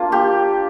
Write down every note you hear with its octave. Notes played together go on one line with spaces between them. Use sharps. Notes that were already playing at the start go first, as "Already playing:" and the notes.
Already playing: A#3 D4 F4
G4